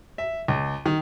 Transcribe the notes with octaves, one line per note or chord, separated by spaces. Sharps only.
E5
C#2
D#3